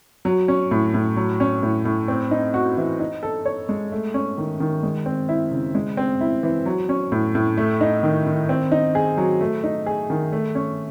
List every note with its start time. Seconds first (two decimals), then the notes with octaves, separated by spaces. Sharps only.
0.25 F#3
0.48 C#4
0.71 A2
0.94 A2
1.16 F#3
1.40 C#4
1.63 A2
1.85 A2
2.08 C4
2.31 D#4
2.54 F#4
2.77 E3
3.00 D#4
3.23 A4
3.45 C#5
3.69 G#3
3.92 A3
4.14 C#4
4.38 D#3
4.60 D#3
4.83 G#3
5.06 C4
5.29 E4
5.51 C#3
5.75 G#3
5.97 C4
6.21 E4
6.43 E3
6.66 F#3
6.89 C#4
7.12 A2
7.35 A2
7.58 A3
7.81 D#4
8.03 D#3
8.26 D#3
8.49 C4
8.72 D#4
8.95 G#4
9.17 F#3
9.41 A3
9.64 D#4
9.86 G#4
10.10 D#3
10.32 A3
10.55 C#4